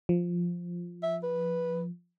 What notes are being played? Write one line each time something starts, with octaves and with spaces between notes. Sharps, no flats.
F3
E5
B4